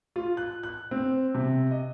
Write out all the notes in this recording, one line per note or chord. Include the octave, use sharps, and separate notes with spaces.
F4
F#6
F#6
C4
C3
D#5